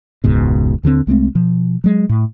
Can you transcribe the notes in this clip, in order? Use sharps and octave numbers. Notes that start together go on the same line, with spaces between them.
E1 C#2 G#2 B2
D#2 D3 D#3 C4
C2 G#3 A3 C4
B2 F3
F#3 G#3
A2